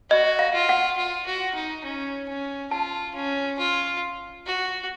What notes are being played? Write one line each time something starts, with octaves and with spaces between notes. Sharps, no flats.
F#4 D#5
F5
F4
F#5
F4
F#4
D#4
C#4
C#4
F4 A5
C#4
F4
F#4